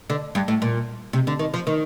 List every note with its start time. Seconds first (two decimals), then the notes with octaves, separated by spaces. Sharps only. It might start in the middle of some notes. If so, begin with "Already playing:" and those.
0.10 D3
0.35 G2
0.48 A2
0.62 A#2
1.13 C3
1.27 D3
1.39 D#3
1.54 F3
1.67 D#3